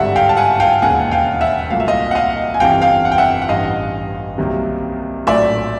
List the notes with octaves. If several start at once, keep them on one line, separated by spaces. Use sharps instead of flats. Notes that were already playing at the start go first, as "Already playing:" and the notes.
Already playing: G#1 G2 D3 G3 E5 F#5
F5 G5
A5
F#5 G#5
F5 G5
E1 D#2 C#3 F#5 G#5
F5 G5
E5 F#5
C2 A#2 F#3 A3 F5
E5
D#5 F5
F#5
D#5 F5
G#5
G1 F2 C3 E3 F5 G5
F5 G5
F#5
G5
E5 F#5
F#5
A1 G2 E3 D#5 F5
C2 C3 D#3 F#3 A#3
A#1 A2 F#3 A3 D5 E5